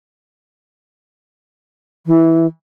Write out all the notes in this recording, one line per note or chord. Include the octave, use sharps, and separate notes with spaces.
E3